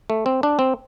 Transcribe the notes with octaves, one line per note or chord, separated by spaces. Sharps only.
A3
C4
D4
C4